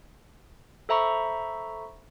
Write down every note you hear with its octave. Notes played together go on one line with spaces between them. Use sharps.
A4 C5 E5 A#5 B5 C#6